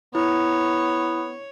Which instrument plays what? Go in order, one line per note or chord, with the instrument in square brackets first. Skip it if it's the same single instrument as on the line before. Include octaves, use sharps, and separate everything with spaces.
[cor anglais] B3 [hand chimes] E4 [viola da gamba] C#5